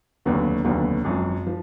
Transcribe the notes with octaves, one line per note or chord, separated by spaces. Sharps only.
F1 D#2 D3 F#3 B3
F1 D#2 D3 F#3 B3
G#1 F#2 F3
F3